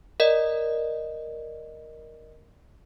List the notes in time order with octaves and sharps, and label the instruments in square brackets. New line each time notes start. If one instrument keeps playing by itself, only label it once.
[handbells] A#4 D5 D#5